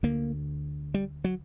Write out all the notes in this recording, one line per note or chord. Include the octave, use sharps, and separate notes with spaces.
D2 D3 A#3
G3
F#3